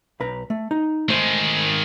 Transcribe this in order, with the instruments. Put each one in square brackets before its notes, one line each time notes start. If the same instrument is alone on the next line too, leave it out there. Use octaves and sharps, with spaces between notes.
[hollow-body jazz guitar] B1 B4 A#5
A3
D#4
[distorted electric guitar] D#3 G#3 [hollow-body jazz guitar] A3 C5